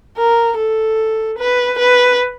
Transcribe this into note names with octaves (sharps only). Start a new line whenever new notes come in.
A#4
A4
B4
B4